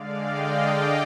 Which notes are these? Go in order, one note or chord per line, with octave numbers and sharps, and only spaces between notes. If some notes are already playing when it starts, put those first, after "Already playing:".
Already playing: D3 G#3 D5 F5
D#5 G5